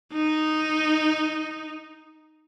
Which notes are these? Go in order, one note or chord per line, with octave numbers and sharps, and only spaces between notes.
D#4